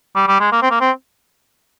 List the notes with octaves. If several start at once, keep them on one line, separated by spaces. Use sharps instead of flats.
G3
G3
G#3
A#3
C4
A#3
C4